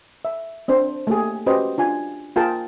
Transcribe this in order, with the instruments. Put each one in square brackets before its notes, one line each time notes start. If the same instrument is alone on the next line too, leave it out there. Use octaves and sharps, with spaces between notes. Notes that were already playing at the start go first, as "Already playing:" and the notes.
[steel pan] E5
C4 D4 C5
A3 A#3 G4 G#4
C#4 F#4 G4 B4 C5 D#5
D4 F4 G#5
A#3 F4 G#4 A#4 G5 A5